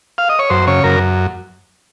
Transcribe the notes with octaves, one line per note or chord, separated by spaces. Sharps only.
F5
D#5
C#5
F#2 C5
C#3 C#5
F#2 A#4